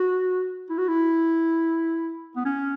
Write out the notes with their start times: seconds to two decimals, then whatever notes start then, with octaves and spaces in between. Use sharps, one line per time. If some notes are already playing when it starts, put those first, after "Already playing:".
Already playing: F#4
0.70 E4
0.78 F#4
0.88 E4
2.36 B3
2.45 C#4